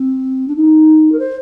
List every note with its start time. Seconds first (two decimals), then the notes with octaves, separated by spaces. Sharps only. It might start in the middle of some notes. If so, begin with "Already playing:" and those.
Already playing: C4
0.48 D4
0.56 D#4
1.12 A#4
1.19 C5